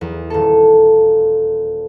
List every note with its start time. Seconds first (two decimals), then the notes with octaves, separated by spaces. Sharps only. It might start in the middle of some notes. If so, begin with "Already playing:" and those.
0.01 E2
0.30 D#1 A4